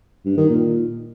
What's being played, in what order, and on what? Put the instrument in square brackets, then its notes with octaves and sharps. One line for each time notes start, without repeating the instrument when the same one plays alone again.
[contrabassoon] G2
D#3
A#2